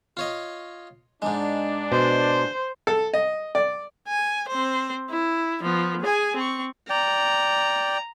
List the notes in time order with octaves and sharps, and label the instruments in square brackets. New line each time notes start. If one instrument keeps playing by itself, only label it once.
[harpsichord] F4 C#5 D#5
[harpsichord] G#2 G#3 [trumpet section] D4
[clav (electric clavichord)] B2 [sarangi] C5
[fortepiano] A4
D#5
D5
[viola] G#5
C4 C5
E4
F3 B3
G#4 G#5
C4 C#6
[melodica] D5 G5 [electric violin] A#5